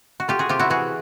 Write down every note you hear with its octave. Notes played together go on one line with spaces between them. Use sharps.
F#4
A3 F4 G4
F#4 G#4
C3 F4 G4
E4 F#4
E3 F#4 G#4